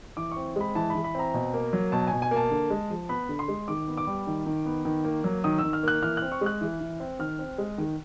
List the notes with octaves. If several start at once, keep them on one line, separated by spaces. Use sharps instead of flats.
E3 D6
C4 C#6
G#3 B5
E3 A5
E3 B5
B5
C4 A#5
B2
A#3
F#3
B2 A5
B2 G#5
G#5
A#3
A5
D3
G#3
F3
B3 B5
D3
C6
G#3
D#3 D6
B3
D6
G3
D#3
D#3
B3
D#3
A#3
F#3
D#3 D#6
D#3 E6
F6
A#3 F#6
E3 F6
C4 F#6
C#6
G#3 F#6
E3
E3
C4
D#3 F6
C4
G#3
D#3